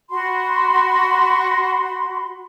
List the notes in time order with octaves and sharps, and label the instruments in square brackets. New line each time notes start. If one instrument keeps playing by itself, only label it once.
[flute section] F#4 B5 C6